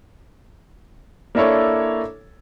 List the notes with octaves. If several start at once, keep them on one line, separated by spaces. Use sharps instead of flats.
A#3 D4 E4 A4 C#5